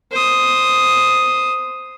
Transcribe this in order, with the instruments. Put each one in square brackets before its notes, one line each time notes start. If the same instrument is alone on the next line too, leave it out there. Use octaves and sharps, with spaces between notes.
[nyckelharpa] C5 D#6